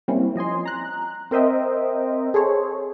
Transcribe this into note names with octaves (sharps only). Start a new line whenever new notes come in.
G3 A#3 C4 C#4 E4
F3 D#5 G#5 C6
A#5 F#6
C4 A#4 C5 D#5 E5 G5
G#4 A4 C5 C#5